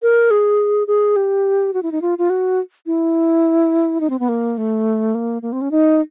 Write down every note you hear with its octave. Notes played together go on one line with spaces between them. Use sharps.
A#4
G#4
G#4
G4
F#4
E4
D#4
F4
F4
F#4
E4
D#4
C4
B3
A#3
A3
A#3
A#3
C4
C#4
D#4